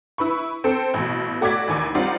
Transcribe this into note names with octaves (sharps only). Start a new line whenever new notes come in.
E4 B4 B5 C#6
C4 A4
A1 B2
A3 F#4 D5 D6 G#6 B6
A1 D#2 G#5 D6
G3 C4 D#4 F4 D5 F#5